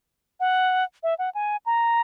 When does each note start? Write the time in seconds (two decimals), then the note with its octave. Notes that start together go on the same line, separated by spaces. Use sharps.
0.40 F#5
1.03 E5
1.19 F#5
1.35 G#5
1.66 A#5